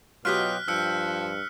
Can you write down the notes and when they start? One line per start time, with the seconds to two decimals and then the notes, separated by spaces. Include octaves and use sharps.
0.25 B2 F#3 F4 G4 D#5 F6 F#6 B6
0.68 G2 F3 G5 E6 F#6 C#7